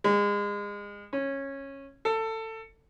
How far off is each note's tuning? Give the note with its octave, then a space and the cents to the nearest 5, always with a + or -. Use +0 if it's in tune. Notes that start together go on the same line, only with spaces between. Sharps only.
G#3 -30
C#4 -15
A4 +20